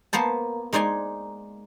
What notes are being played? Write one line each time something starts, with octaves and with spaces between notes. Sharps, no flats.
A#3 B3 C5 A5
G#3 D#4 C5 D5 G#5